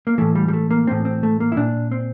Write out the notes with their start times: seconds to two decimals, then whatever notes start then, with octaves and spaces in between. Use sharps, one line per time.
0.07 A#3
0.18 A2 E3 A3
0.35 G3
0.48 G3
0.53 A3
0.70 A#3
0.87 A2 E3 C4
1.05 C4
1.23 A3
1.40 A#3
1.52 E4
1.57 A#2 D4
1.91 C4